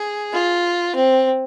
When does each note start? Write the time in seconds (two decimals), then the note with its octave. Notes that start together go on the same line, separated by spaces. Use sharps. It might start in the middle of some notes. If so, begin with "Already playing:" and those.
Already playing: G#4
0.33 F4
0.96 C4